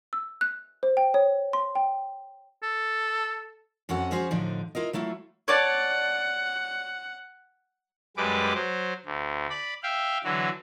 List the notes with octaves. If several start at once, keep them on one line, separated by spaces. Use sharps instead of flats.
E6
F#6
C5
G5
C#5
C6
G5
A4
F2 C#4 F#4 A4 F#5
F3 C#4 F#4 G#4 C5
A2 D3 F3 D4 D#4
E4 F4 A#4 D#5
F#3 A3 E4 F4
C#5 D5 F#5 A5
F#2 G3 G#3 B4 D6
F#3 C5
D2
D5 B5
E5 F5 G5
D3 E3 F#3 F#4